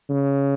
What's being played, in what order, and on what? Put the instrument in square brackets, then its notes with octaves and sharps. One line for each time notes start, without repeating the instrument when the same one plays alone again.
[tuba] C#3